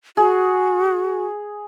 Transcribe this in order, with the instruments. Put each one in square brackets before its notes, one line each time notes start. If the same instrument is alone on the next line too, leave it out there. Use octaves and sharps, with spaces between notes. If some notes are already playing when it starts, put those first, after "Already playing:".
[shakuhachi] F#4 [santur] G#4